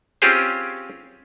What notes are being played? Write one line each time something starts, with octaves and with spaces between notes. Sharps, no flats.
C4 C#4 F4 G4 G#4 C5